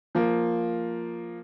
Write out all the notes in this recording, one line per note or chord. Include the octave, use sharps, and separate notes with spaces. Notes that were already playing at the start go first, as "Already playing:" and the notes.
F3 A#3